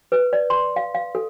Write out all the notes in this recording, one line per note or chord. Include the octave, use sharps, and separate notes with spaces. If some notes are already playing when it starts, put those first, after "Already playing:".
B4
D5
C6
F5
F5
A4